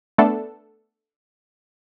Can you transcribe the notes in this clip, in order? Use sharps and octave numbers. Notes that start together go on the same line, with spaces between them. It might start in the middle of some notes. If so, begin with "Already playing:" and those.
A3 B3 D4 A4